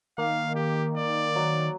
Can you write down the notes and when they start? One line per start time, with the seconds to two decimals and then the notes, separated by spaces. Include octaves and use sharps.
0.18 D#3 A#3 F5
0.55 G4
0.97 D5
1.36 F#3